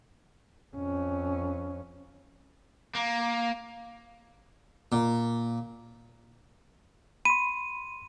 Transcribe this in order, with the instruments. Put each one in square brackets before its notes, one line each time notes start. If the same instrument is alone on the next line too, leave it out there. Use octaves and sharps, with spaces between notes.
[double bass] F2 C#4
[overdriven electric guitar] A#3
[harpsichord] A#2
[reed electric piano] B5 C6 [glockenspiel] D#7